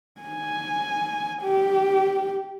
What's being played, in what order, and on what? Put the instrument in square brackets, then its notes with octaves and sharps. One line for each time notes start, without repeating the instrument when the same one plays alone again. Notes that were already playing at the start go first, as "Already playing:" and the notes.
[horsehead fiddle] G#5
G4